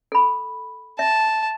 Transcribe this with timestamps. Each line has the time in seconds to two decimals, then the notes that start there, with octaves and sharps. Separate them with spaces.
0.12 A4 B5
0.99 E5 A5